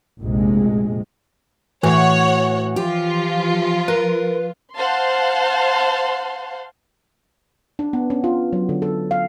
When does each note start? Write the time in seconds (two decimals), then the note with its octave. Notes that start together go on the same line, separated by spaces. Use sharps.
0.21 F1 A#1 C3 G#3
1.83 A2 E3 F#4 C#5 F#5
2.76 F3 F4 G4
3.88 A#4 B4
4.75 C5 F5 F#5 A5 C6
7.79 D4
7.93 B3
8.10 C#4
8.24 F4
8.53 F#3
8.69 D3
8.82 A4
9.11 F5